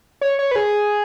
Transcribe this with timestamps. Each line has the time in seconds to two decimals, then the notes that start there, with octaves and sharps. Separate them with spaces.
0.21 C#5
0.39 C#5
0.51 B4
0.56 G#4